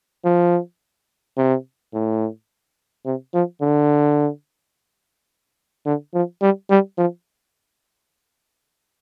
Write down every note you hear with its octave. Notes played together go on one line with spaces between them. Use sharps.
F3
C3
A2
C3
F3
D3
D3
F3
G3
G3
F3